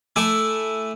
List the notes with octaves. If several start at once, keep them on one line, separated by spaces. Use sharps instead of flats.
A3 E4 G#5 D6